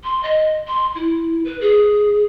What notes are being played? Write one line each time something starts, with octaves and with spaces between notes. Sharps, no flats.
C6
D#5
C6
E4
B4
G#4